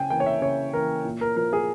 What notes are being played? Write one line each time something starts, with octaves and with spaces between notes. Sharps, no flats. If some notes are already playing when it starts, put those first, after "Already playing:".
Already playing: C#3 G5 G#5
E3 A#3 G5
C#5
E5
C#3 C#5
E3 A#3 A#4
A#2
A#4
F3 A#3 A#4
G#4